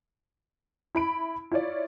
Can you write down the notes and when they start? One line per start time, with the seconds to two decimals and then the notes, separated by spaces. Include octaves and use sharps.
0.95 E4 B5 D7
1.52 E4 F4 C#5 D5